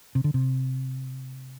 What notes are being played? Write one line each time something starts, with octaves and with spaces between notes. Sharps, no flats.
C3
D3
C3